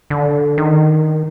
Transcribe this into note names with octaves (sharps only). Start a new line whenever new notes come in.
D3
D#3